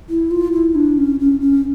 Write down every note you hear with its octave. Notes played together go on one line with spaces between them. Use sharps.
E4
F4
E4
D4
C#4
C#4
C#4